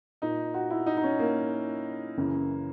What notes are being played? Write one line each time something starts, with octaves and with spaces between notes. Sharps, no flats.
A#2 D#4
F#4
E4
D#4
D#4
C#4
A#3
F#2 C#3 E3